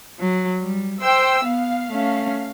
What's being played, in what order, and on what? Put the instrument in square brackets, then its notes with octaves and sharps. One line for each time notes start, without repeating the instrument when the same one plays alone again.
[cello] F#3
G3
[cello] C5 [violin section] G5 E6
[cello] B3 [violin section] F5
[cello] A3 C#4